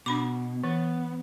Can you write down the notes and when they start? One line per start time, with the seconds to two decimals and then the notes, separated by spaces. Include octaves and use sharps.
0.06 B2 D4 B5 D6
0.64 E3 B3